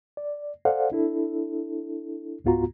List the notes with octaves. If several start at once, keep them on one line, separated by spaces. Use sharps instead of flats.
D5
A4 C5 D5 F5 F#5
D4 E4 A4
C#2 G#2 B3 F4 F#4 A#5